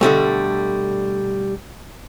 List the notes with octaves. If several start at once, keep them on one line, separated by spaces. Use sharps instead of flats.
B2 D3 G3 A3